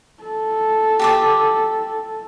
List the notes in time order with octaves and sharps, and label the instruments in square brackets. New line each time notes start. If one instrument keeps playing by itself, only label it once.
[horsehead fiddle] A4
[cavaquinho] G4 A5 D6